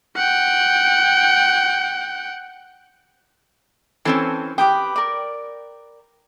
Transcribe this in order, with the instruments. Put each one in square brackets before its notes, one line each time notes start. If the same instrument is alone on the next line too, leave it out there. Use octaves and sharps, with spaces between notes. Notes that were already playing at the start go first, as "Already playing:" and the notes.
[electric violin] F#5 G5
[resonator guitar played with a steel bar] E3 C4 C#4 [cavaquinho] A4 A5
[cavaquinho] G4 B4 D#6 [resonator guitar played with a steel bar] G5
[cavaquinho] A#4 D5